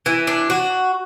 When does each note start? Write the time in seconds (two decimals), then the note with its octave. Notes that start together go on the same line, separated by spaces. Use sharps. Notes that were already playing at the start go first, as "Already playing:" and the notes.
0.06 E3
0.27 D4
0.50 F#4